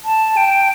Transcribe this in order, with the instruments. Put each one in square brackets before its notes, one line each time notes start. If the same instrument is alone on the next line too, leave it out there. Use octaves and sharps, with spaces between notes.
[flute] A5
G5